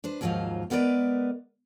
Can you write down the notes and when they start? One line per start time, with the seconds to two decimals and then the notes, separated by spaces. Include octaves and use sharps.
0.04 D4 B4 C5
0.21 D#2 G#2 F3 F#3 F4 F5
0.70 G#3 B3 A#4 B4 D5